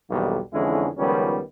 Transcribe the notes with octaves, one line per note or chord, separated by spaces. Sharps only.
B1 E2 D3 D#3 G3 A#3
F2 D3 E3 G#3 C#4 E4
C#2 D#3 F3 G3 B3 C#4